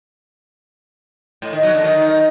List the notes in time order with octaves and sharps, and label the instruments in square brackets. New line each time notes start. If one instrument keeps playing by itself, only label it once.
[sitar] A2
D#3
F#3
D3
D#3